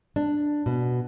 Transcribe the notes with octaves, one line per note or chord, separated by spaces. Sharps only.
D4
B2